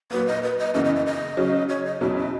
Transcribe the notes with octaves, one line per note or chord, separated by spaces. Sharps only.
A#2 F#3 A#3 B4
D#5
B4
D#5
F#2 C#3 E3 B3 D#5
D#5
D#5
D#5
C#3 F#3 C#4
C#5
D#5
E2 B2 F#3 C#4 E4 E5
D#5